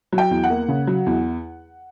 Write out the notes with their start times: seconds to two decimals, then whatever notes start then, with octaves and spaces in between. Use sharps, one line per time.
0.12 F#3
0.18 G5
0.31 E2
0.44 F#5
0.50 A#3
0.68 C#3
0.87 F#3
1.06 E2